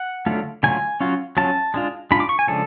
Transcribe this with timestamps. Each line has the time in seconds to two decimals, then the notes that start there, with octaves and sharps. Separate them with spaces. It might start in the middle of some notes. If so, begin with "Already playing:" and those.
Already playing: F#5
0.26 D3 F#3 A3 F4
0.63 D3 F#3 A3 F4 G#5
1.00 F#3 C#4 F4
1.37 F#3 C#4 F4 A5
1.74 G#3 D4 F4
2.11 G#3 D4 F4 B5
2.20 D6
2.29 C#6
2.39 G#5
2.48 C#3 F3 G#3 D4 A4